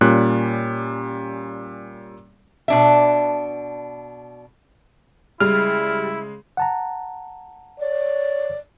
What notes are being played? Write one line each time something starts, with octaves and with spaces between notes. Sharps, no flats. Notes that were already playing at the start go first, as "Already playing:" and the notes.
A#2 G3 C#4 F#6
B2 D4 E5
C#3 G3 G#3 E4 F6
F#5 A5 A#5
C#5 D5